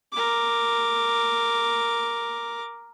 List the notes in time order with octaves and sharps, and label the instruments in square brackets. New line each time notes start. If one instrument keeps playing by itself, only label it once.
[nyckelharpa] A#4 D6